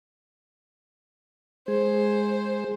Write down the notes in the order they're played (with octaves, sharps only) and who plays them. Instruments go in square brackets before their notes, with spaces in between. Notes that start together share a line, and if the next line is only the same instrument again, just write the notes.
[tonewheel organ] G#3 G#4 [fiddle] C5